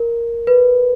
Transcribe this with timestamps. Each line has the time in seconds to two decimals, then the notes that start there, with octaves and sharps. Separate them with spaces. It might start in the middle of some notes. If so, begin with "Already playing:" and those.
Already playing: A#4
0.47 B4